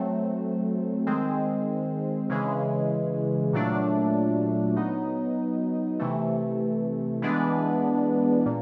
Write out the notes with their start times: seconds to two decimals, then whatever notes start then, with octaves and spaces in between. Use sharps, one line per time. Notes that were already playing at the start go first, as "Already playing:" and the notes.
Already playing: F#3 A3 C4
1.07 D#3 G#3 C4
2.29 C#3 E3 G#3
3.53 A#2 F#3 A3 D4
4.76 F#3 B3 D#4
5.99 C3 E3 A3
7.22 E3 G#3 B3 D4
8.46 A#2